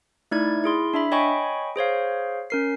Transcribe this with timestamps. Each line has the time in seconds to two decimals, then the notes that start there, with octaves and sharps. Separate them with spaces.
0.31 A3 D#4 E4 D5 G#6
0.64 E4 G#4 C6
0.94 D4 E5 B5
1.12 C#5 D#5 G5 G#5 B5 C#6
1.76 G#4 C5 C#5 F5
2.50 C#4 A#4 C7